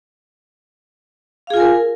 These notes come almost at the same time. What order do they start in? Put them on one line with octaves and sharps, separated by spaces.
F5 G#4 F4 G#5 A#4